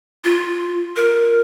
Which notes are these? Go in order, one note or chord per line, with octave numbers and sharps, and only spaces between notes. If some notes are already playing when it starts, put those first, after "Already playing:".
F4
A#4